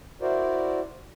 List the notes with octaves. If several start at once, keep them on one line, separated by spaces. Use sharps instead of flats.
E4 F#4 A#4 C5 D5